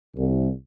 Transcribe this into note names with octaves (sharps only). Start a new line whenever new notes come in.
C2